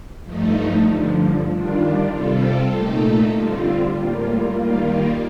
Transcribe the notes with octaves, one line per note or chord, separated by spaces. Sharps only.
G2 F3 A3 D#4
G2 D3 F3
D#3 G3 D4 F4
C3 G3 C4 F4 A4
A#2 A3 D#4 A4
D3 G3 C4 F4
A2 G3 A#3 F4
D#3 G3 A#3 F4